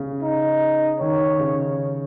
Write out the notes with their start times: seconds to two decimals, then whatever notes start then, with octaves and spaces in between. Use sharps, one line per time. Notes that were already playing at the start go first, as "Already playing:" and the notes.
Already playing: C#3
0.22 D#4
1.00 D#3 C#5
1.39 C#3